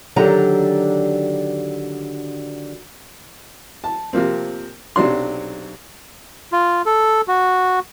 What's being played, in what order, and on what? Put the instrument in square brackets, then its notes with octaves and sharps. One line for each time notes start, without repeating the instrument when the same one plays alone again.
[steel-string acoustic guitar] D3 D#3 F#3 D4 G4 A#5
[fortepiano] A5
C3 F3 A#3 C4
B1 C3 F#3 D4 C6
[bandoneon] F4
A4
F#4